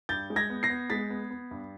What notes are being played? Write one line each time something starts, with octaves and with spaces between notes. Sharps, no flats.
G2 G6 A6
G#3
G#6 A#6
B3
A#6 C7
B3
G#3 A6 B6
B3
B3
G2